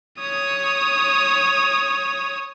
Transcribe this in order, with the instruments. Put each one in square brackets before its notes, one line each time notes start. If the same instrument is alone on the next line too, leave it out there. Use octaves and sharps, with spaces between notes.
[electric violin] C#5 D#6